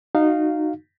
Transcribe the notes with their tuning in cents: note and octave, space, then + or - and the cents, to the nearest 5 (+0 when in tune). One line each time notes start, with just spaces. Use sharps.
D#4 -20 F#4 +0 F5 +0